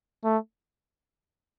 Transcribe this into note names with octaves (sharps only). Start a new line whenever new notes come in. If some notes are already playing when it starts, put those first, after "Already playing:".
A3